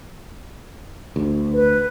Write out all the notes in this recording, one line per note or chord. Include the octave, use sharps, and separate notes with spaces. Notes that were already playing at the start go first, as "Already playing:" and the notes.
D2
B4